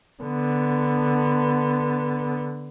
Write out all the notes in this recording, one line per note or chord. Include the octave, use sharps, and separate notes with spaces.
D3 B3